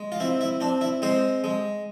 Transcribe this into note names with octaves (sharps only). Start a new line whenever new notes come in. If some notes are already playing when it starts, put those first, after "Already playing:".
Already playing: G#3
F4
C4 E4
E4
C4 D4
E4
G#3 C4 C5
G#3